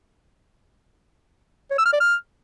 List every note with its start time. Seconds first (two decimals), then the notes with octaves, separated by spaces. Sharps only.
1.71 C#5
1.78 E6
1.86 F6
1.93 D5
2.00 F6